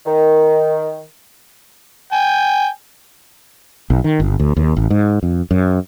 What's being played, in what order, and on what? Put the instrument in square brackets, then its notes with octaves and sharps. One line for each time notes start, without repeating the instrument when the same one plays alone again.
[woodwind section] D#3
[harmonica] G5 G#5
[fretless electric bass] B1
D#3
G1
D2
D#2
A1
G#2
F2
F#2